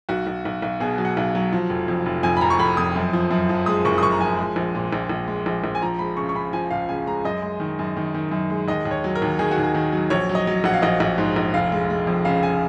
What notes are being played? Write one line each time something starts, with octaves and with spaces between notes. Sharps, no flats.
B1 F#4
B1
B1
B1
B2 G#4
F#3
F#5
B1
F#3
F3
F1
F2
F1
F2 G#5
B5
F1 A#5
C#6
F1 B5
F2 D#6
F#2
F3
F#2
F3
G#3 D#6
F#1 C#6
D#6
F#1 C#6
A#5
F3 G#5
G#3
A#1
A#2
A#1
A#1
G#3
A#1
A#1
G#5
F3 A#5
G#3 B5
C#3 C#6
C#6
C#3 B5
F3 G#5
C#2 F5
C#3 G#5
G#3 A#5
F#2 D#5
G#3
D#3
F#2
D#3
D#3
F#2
G#3
D#2 D#5
D#2
C#5
F#3
A#4
D#2
D#3 G#4
F#4
D#2
G#4
D#3
F#3
A#1 C#5
F#3
D#5
F#3
A#1 F#5
F5
A#1 D#5
A#1
G#2
A#1
F1 F5
G#3
G#3
F2
C#3 F5
G#5